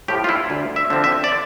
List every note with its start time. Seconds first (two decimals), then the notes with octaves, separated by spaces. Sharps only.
0.08 A2 F3 G4
0.24 F4
0.29 E4
0.50 D2
0.76 E5
0.90 D3 F3 C4
1.04 E5
1.24 D5